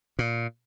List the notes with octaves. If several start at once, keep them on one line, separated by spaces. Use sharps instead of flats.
A#2